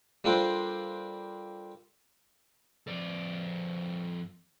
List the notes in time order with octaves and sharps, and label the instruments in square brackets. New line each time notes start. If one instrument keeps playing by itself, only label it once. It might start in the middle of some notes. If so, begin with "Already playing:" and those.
[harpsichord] G3 A#3 D4 F4 A4 C5
[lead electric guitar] F2 D5